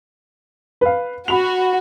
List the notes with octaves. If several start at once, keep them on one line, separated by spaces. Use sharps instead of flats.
B4 F5
F#4 B5 F7